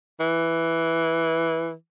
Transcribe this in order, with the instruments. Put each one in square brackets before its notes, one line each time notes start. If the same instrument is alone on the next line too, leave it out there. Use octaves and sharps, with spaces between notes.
[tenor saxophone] E3